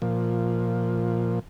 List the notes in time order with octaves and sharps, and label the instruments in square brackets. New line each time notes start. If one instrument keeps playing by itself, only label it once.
[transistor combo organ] A#2 F3